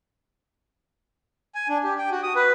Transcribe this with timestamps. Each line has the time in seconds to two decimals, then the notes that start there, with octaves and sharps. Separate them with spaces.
1.55 G#5
1.69 D4
1.84 G4
1.98 G5
2.11 F#4
2.23 D#6
2.36 B4